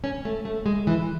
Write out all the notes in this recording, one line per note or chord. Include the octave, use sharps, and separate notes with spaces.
C#4
A3
A3
G#3
E3